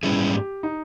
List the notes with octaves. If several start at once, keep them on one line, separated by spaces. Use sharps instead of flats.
G#2 G3 C#4 E4 G#4
G4
D#4